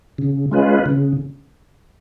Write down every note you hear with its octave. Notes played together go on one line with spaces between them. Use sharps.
C#3
G#3 C#4 F4 B4
C#3